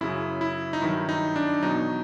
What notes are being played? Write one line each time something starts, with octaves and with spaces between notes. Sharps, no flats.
F#2 C#3 F#3 E4
E4
D#4
G2 D#3 F#3 E4
D#4
D4
E2 B2 F#3 D#4